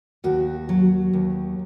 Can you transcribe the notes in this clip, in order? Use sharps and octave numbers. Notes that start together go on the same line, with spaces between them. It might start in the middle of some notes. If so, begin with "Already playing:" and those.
D#2 F#4
F#3
D#2